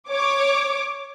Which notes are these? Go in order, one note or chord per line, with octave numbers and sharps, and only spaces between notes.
C#5 D6